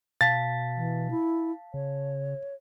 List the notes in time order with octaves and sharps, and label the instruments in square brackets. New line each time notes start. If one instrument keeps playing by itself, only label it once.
[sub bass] B2 [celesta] F5 A5 B6 [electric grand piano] A6
[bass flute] E3
E4
[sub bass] C#3 [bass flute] C#5